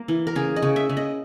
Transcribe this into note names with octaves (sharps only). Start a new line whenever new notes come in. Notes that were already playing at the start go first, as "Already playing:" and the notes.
Already playing: A#3
E3
A#4
C#3 G#4
D#5
C#3
E5
C#3
D#5